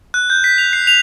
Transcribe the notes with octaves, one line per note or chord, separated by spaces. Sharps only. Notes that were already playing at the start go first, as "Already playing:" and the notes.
F#6
G6
B6
F7
C7
F7